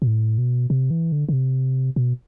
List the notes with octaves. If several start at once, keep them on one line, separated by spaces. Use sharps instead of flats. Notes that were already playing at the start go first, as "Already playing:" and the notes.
B2
A2
B2
C3
E3
D3
D3
C3
B2